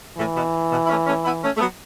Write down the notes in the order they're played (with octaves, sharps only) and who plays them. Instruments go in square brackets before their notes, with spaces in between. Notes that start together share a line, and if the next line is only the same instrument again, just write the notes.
[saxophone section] A2 [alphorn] E3
[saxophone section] B2
B2
E4
A3 C#4
A3 C#4
B3 E4
A3 C#4
A3
F#3 B3